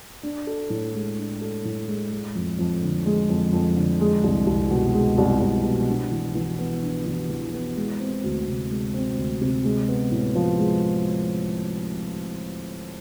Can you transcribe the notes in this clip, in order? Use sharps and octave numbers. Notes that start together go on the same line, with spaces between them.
D4
A4
A2
G#3
D4
A4
A2
G#3
G#3
F2
F2
D3
G#3
F2
F2
D3
G#3
C2
C2
B2
G#3
C2
C2
B2
D4
E3
E3
B3
D4
E3
E3
B3
G#3
C4
D2
C3
G#3
C4
D2
C3
G#3
B3
A2
F3
G#3